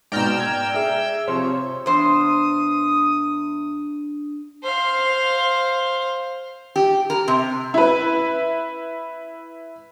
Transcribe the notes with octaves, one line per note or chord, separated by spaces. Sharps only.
G#2 B2 D5 G5 A#5 E6 F6
G#6
G#4 E5
C3 F3 C5 C#5
E2 D4 C5 D#6
C5 F5
G4
A#4
C3
E4 B4